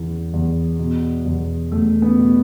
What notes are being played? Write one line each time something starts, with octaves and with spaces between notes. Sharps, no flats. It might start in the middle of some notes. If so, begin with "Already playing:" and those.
Already playing: E2 E3
E2
B2
E2
E2 A3
B3
B2